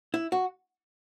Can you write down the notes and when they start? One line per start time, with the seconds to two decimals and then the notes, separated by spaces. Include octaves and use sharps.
0.14 E4
0.32 F#4